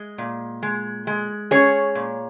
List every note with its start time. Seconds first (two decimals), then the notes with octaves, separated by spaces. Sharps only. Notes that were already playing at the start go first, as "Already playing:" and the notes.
Already playing: G#3
0.18 A#2
0.63 G#3
1.07 G#3
1.51 C#4 G#4 C#5
1.95 A#2